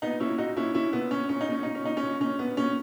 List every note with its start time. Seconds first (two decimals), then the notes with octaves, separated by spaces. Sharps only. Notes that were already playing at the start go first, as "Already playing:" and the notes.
0.02 A#2 B3 D#4
0.20 A#2 C#4 E4
0.38 A#2 D#4 F#4
0.56 A#2 C#4 E4
0.74 A#2 C#4 E4
0.93 A#2 B3
1.11 A#2 C#4
1.29 A#2 C#4
1.41 D#4
1.48 A#2 C#4
1.63 A#2 D#4
1.75 C#4
1.84 A#2 D#4
1.97 C#4
2.03 A#2
2.20 A#2 C#4
2.39 A#2 B3
2.57 A#2 C#4